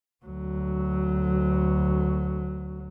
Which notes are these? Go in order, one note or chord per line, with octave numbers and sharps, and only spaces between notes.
D2 F#3